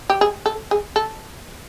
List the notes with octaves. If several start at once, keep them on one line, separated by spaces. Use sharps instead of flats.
G4
G#4
A4
G#4
A4